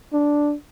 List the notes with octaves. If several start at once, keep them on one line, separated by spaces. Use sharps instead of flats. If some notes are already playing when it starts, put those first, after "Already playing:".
D4